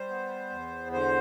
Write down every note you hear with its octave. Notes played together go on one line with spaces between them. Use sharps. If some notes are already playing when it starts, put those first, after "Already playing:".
Already playing: G3 C5
B3
E2
D3 C5